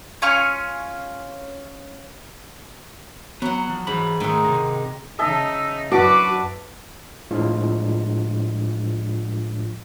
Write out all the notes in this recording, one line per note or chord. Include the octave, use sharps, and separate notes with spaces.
C#4 F4 G#5 C#6
F#3 B3 F#5
F3
G#2 E3 B5
G#2 D#3 G#3 A3
C3 D#4
C#3 D#4 D#5 E5 A5
F#2 D4 F#4 B4 D6
A2 F3 G#3 D4 F4